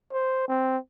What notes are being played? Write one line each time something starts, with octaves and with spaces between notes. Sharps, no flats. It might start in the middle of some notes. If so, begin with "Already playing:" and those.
C5
C4